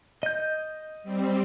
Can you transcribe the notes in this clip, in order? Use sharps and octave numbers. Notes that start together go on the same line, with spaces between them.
D#5 G6
G3 C4